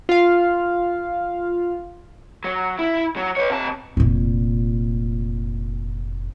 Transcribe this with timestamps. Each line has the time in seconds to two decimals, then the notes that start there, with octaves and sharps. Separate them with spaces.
0.09 F4 F5
2.44 F#3
2.79 E4
3.16 F#3
3.37 B4 C#5
3.50 C3 A5
3.97 F1 A#2